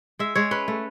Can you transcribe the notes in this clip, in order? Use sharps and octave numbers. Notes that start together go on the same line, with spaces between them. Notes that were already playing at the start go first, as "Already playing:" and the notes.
G#3 E5
G#3 C#5
C#4 B4
A3